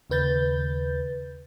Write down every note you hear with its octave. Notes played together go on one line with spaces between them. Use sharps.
D#2 C#3 B4 G6 A6